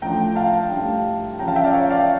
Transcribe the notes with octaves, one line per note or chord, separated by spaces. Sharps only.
A2 F3 A3 D4 G5 A#5
F5 A5
A2 G3 D4
C#3 F3 C#4 G5 A#5
F5 A5
E5 G5
D5 F5
C#5 E5
D5 F5